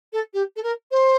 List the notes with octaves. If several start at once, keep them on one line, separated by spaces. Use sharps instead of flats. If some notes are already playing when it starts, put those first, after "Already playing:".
A4
G4
A4
A#4
C5